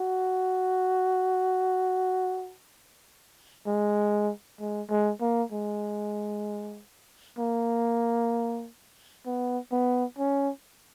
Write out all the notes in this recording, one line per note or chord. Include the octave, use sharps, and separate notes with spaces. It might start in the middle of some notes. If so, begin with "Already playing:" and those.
Already playing: F#4
G#3
G#3
G#3
A#3
G#3
A#3
B3
B3
C#4